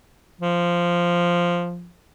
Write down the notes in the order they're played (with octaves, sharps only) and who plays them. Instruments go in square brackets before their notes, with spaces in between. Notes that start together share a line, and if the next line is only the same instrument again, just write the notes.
[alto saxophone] F3